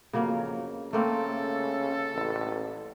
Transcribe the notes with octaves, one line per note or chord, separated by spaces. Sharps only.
F2 C#3 F#3 A#3
C#3 A3 A#3 C4 A4
A1